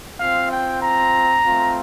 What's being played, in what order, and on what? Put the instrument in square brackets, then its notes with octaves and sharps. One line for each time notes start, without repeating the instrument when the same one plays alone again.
[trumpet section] C4 F4 F5
G5
A#5
A3 C4 F4